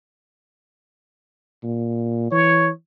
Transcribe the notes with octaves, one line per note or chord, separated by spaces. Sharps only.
A#2
E3 C#5